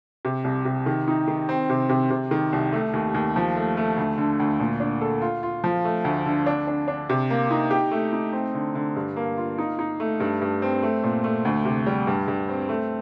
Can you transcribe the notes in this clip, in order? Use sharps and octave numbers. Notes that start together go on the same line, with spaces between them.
C3
C2
C3
D#3
D#4
D#3
C4
C3
C3
C3
D#3
C2
A3
D#2
D#2
F3
A3
A3
D2
D3
D2
A#2
D4
A4
F4
F4
F3
A3
D2
D3
D4
D4
D4
C3
A#3
D#4
G4
A3
D#4
C4
D3
D3
G2
A#3
F4
D#4
D#4
A3
G2
G2
C4
A3
A#2
A3
D2
C3
G3
G2
G2
C4
A3